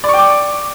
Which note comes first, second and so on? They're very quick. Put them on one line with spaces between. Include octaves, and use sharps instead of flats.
D5 C#6 G5 D6